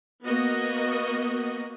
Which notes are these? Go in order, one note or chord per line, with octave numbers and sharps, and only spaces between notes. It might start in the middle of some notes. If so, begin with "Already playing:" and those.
A#3 B3 F#4 D#5